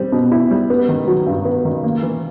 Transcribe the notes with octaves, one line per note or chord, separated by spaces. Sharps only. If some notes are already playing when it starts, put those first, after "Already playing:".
Already playing: G3 C4
B2
E4
G3
B3
D#3
F#3
G2
B3
D#3
A#3
E3